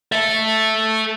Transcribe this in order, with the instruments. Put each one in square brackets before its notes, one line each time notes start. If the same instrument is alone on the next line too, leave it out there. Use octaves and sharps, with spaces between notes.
[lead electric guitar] A4 E5